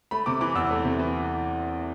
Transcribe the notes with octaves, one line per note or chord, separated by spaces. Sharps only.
A3 B5
C3 D6
E3 D6
E2 E6
A3
C3
E3